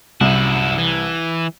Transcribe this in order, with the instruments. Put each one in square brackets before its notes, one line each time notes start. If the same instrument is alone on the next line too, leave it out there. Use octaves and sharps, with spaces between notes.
[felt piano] C2 [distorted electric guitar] F#2 E4
[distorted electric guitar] E3